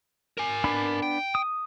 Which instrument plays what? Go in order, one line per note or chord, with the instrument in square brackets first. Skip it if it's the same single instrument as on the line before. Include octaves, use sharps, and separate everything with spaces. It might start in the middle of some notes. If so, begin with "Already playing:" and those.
[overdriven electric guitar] A#4 G#5
[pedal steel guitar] B3 D4 B5
[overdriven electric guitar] G5
[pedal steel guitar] D#6